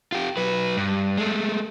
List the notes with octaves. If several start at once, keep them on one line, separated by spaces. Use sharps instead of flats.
F4 G4
F#3 B4
G2
G#3 A3